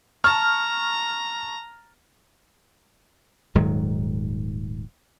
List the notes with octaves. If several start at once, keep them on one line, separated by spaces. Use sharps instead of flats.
A5 A#5 C#6 F6
D#1 G#2 D#3 F#3